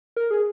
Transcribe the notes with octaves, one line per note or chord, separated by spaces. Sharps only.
A#4
G#4